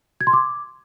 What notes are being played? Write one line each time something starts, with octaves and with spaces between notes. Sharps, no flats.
G#6
C6
D6